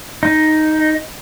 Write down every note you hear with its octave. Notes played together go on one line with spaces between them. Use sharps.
D#4